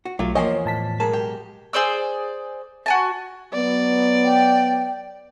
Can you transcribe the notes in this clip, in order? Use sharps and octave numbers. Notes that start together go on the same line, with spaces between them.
F#4
B1 F#3 A3 F4 G4
E2 F3 A#3 C#5 D#5 G#5
A2 A5 B6
B1 G#3 A#4 A5
G4
G#4 C5 D5 E6
F#4 G#5 A5
F#3 B3 D5
G5